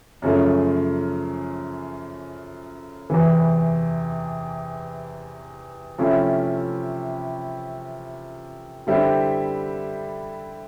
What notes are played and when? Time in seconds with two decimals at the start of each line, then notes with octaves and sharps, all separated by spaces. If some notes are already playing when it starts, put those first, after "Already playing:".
0.22 F#2 C#3 F3 A3
3.10 E2 C3 E3
5.98 C3 F3 A3 C#4 E4
8.87 D3 G3 C4 E4 G4